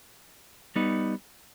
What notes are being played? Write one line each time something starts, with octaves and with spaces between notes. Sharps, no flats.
G3 B3 D#4